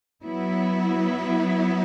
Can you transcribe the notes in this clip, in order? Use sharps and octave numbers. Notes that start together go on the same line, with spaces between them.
F#3 B3 E4